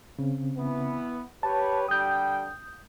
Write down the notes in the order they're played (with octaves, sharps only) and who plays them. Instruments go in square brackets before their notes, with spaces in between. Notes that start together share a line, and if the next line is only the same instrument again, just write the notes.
[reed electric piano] C#3 C4
[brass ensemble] E3 B3
[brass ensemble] G4 B4 C#5 [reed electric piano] A5
[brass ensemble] D3 G3 G5 [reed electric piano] D#6 G6